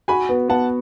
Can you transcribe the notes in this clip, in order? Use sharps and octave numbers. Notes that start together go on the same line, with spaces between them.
F#4 G#5 B5
B3
B3 F#5 A5